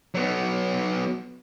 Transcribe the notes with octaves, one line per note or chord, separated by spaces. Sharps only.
F#3 B3